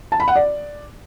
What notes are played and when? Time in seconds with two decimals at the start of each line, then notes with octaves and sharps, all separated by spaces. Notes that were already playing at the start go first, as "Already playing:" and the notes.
0.12 A5
0.20 B5
0.28 F#5
0.36 D5